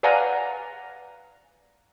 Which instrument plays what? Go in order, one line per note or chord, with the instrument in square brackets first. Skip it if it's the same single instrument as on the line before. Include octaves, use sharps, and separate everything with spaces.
[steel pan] B4 D5 F5 F#5 G#5 A#5